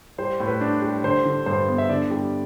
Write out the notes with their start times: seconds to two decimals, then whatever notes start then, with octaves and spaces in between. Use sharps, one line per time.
0.18 G3 C5
0.40 A2
0.47 B4
0.61 D4
0.82 G3
1.04 D3 C5
1.25 D3
1.46 G2 C5
1.68 B3
1.78 E5
1.89 D3 D5
2.11 G3